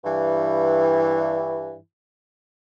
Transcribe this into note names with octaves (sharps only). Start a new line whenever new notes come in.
G2 E3